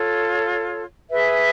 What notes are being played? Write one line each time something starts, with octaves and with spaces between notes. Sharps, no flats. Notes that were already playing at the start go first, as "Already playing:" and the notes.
Already playing: F4 A4 C#5
G#4 B4 E5